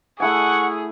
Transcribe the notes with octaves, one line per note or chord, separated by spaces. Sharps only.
A3 E4 G#4 F#5 G#5 C#6